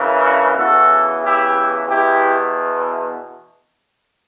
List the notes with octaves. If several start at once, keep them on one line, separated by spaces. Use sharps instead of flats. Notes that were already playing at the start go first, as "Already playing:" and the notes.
Already playing: F#2 C#3 E3
D4 F#4
E2 C#3 E3 F#4 A4
E4 G4
E2 B2 E4 G4